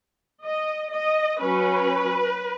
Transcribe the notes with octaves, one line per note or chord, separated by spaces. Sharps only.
D#5
D#5
F#3 C#4 B4